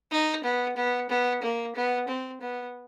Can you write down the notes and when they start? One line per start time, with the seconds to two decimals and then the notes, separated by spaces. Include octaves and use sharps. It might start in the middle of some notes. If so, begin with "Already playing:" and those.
0.11 D#4
0.44 B3
0.76 B3
1.09 B3
1.42 A#3
1.75 B3
2.08 C4
2.41 B3